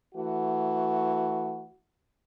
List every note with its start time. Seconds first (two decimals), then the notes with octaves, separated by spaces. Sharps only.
0.15 E3 A3 F#4